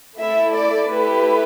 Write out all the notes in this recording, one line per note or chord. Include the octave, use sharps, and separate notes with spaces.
A3 E4 A4 E5
D5
A3 E4 G4 B4